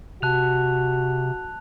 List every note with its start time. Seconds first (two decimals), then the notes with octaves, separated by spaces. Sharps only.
0.22 C3 F#4 A5 F#6 F7